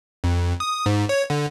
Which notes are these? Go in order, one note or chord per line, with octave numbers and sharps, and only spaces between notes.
F2
D#6
G#2
C#5
D3